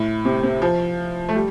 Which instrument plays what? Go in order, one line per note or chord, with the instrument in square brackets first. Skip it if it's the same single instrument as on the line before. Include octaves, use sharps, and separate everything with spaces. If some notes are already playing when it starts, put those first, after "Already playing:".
Already playing: [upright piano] A2
C3
C3
F3
A3
G3